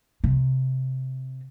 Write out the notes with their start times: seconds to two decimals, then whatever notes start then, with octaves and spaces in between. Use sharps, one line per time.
0.24 C3